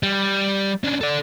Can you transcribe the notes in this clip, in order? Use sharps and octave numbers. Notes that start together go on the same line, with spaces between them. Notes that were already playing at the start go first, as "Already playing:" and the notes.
G3
C#4 D4
A4 D5